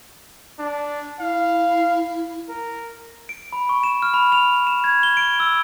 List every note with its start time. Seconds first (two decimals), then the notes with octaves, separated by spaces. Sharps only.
0.59 D4
1.20 E4 F5
2.49 A#4
3.29 D7
3.53 B5
3.69 C#6
3.83 E7
4.02 F6
4.14 B5
4.32 F7
4.67 E7
4.84 G#6
5.03 G7
5.17 D7
5.40 E6